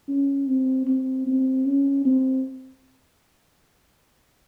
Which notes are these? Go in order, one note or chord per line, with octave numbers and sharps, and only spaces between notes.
C#4
C4
C4
C4
C#4
C4